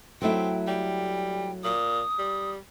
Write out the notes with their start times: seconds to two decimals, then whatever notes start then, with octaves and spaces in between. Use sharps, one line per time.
0.22 F#3 A3 C4 E4 G5
0.67 G3 G5
1.64 A#2 D#6
2.18 G3